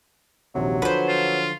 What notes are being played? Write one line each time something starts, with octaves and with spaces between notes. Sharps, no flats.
A#1 D#2 C3 F#3
D3 F3 B4 C5
F4